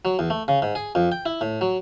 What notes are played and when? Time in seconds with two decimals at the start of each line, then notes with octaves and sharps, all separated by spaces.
0.05 F#3
0.19 E2
0.30 A3
0.48 C#3
0.62 G#2
0.75 G#4
0.95 F2
1.12 G5
1.26 E4
1.41 A2
1.61 F#3